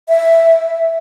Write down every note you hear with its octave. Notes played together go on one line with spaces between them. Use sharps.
E5